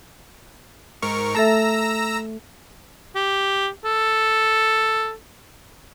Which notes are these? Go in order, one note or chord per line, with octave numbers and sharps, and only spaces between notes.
G#2 A#4 C#6
A3 A4 E5 A#5 E6 A#6
G4
A4